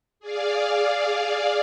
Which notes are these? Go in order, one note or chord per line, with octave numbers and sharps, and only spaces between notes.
G#4 D5 F5